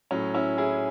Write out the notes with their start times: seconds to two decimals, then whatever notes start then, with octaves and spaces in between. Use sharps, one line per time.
0.11 A2 F#3 C#4
0.34 C#4 E4
0.58 E4 G#4